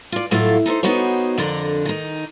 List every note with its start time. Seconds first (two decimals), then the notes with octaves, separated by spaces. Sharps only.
0.12 F4 D5
0.31 A2 F#3 A3 E4 F4
0.66 D#4 A4 B4 C5
0.83 B3 D#4 F#4 C5 C#5
1.38 F2 D3 D4 A#4
1.85 D#3 D#4